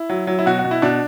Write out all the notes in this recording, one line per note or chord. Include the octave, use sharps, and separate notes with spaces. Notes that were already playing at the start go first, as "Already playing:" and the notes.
Already playing: E4
F#3
F#3
E4
B2 F#4
F#4
B2
E4
B2 D4